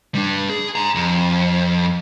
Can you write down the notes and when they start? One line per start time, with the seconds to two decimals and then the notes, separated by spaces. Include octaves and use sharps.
0.15 G3 D4
0.50 G#4
0.76 G#5 A#5
0.95 F2